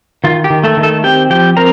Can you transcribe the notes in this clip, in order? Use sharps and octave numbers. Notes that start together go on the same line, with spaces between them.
D#3 F4
G4
D#3
A3 A4
D#3
A3 A4
C4 G4 G5
F3 G4 G5
C4 A#4 A#5